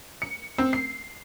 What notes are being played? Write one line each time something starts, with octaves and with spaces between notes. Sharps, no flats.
C#7
C4
C7